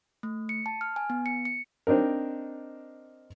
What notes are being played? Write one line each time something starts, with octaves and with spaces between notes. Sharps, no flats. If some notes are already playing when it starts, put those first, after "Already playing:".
A3
C#7
A5
F6
G#5
B3
C#7
C#7
C4 D4 D#4 A#4